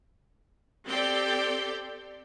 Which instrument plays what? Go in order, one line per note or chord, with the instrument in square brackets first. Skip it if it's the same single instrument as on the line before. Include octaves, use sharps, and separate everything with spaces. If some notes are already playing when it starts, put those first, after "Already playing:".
[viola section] C4 G4 A4 D5 G5 C6